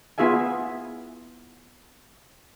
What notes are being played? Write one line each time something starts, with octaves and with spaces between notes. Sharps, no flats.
B3 E4 F4 G#4 E5 G#5